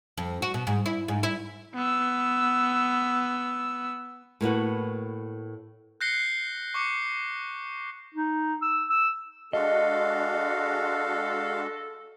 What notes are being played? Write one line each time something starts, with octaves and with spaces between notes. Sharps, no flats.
F2
F#4
B2
G#2
E4
G#2
E4
B3 E6
A2 A#3 B3 F#4
F#6 G6 A#6 C7 C#7 G7
C#6 D6 C#7
D#4
E6
E6
G#3 D4 F#4 A4 D#5 F5